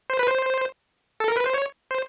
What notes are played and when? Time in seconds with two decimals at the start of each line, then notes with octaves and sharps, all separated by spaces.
0.10 C5
0.19 B4
0.27 C5
1.20 A4
1.28 A#4
1.37 B4
1.46 C5
1.54 C#5
1.91 C5